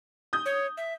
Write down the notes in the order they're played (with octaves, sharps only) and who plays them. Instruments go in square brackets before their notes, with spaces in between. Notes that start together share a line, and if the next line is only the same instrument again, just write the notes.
[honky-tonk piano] D#6 G6
[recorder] C#5
E5